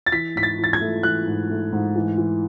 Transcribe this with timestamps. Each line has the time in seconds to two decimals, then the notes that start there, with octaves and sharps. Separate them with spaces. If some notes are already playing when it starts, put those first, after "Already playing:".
0.06 A6
0.12 E3 B6
0.35 G#2 B6
0.43 A6
0.59 E3 A6
0.73 G#6
0.81 A3
1.03 E3 F#6
1.27 G#2
1.50 A3
1.73 G#2
1.96 E3
2.18 E3